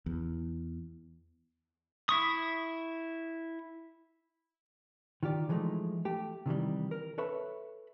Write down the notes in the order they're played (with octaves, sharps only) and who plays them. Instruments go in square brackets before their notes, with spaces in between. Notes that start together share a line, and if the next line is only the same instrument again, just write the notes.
[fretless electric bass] E2
[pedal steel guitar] E4 C#6 D#6
[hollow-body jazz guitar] D#3 F4 G4 D5
E3 F3 G#3 A3 D#4
A3 G4
C3 D#3 E3 G3
A#4
A4 B4 C#5 E5 B5